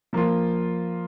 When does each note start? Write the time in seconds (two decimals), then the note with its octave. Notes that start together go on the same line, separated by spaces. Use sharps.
0.13 F3 A#3 F4